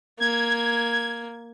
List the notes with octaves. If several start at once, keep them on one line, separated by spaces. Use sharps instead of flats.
A#3 G#6